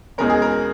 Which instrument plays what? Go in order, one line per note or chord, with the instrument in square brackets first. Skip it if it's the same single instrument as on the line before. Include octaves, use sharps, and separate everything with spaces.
[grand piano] E2 B2 G#3 C#4 A#4
G#4
A#4